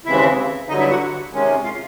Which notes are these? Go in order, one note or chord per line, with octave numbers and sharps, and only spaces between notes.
D#2 C#3 E3 G#3 C4 E4 E5
G2 D3 F#3 D#4 D#5
E4 E5
F#4 F#5
C3 D#3 G#3 C#4
F4 F5